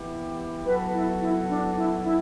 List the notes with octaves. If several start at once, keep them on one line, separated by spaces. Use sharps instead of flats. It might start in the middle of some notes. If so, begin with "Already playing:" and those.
Already playing: E3 B3 E4 G4
F#3 B3 F#4 A4 B4
E4
E4
D4
E4
E4